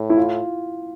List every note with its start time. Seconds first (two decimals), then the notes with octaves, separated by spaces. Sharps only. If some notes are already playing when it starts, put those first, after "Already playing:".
Already playing: A2
0.10 E4
0.17 F4